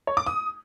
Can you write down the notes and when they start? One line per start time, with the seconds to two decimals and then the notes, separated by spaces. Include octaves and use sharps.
0.07 C#5
0.17 D6
0.27 D#6